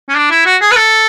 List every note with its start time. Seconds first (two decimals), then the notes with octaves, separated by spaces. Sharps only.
0.09 C#4
0.16 D4
0.31 E4
0.45 F#4
0.61 G#4
0.71 B4
0.76 A4